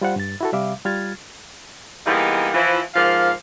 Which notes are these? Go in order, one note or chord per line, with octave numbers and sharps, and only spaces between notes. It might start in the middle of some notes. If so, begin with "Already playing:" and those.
G3 F4 C5 F#5
G2 A6
E4 F#4 A4
C3 G3 E5 F5 D6
G3 F4 F6 G#6 A6
E3 G3 G#3 A#3 B3 D#4
E3 F3 E4
G#2 F3 A#3 F5